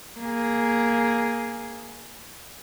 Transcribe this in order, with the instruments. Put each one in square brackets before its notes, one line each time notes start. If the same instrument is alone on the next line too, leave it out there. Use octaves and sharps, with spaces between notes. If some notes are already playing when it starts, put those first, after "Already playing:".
[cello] A#3 G#4